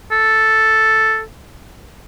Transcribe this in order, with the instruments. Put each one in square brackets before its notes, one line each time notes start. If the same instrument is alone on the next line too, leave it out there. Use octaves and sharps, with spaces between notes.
[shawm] A4